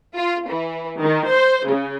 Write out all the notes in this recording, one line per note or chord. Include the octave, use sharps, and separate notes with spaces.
F4
E3
D#3
C5
C#3